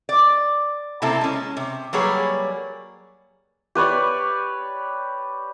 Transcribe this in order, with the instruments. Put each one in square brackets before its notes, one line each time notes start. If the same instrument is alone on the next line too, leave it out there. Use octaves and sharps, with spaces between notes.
[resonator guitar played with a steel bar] D5
C3 A#3 C4 E4 A4
G#3 C#4
C3
F#3 G3 A#3 G#4 B4 C#5
[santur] G4 B4 C#5 D5